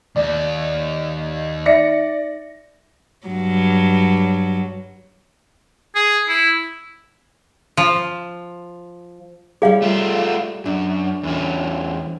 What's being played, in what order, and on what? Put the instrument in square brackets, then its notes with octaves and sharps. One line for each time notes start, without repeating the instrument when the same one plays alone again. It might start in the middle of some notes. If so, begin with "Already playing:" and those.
[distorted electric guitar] D#2 [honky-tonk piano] D5
[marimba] D#4 E5 [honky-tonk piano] D5 A#6 C#7
[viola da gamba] G2 F#3
[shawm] G#4
E4
[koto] F3
[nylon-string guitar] G3 G4 C#5 [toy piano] G#4 F5
[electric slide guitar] A3 F4
[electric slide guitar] F#2 [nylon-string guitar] D4
[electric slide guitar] E2 C#4